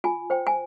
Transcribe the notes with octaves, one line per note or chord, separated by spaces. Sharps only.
F4 G#5
C5 G5
G#5